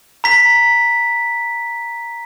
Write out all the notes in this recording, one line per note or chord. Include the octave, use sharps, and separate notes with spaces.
A#5 B6